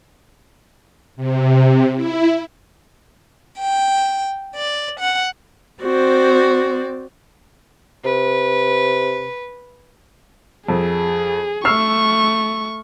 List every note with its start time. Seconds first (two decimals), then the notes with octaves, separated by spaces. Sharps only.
1.16 C3
1.95 E4
3.59 G5
4.56 D5
5.00 F#5
5.82 C4 F#4 C5 D5
8.05 C3 B4
10.69 F2 G#4
11.65 A3 C#6 E6 F6 C7